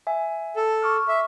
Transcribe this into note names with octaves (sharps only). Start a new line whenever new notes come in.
E5 G#5
A4
C#6 D6 F6
E5